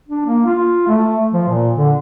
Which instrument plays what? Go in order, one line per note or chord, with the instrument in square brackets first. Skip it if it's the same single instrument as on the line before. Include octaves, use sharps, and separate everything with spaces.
[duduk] D4
A#3
F4
A3
F3
A#2
D3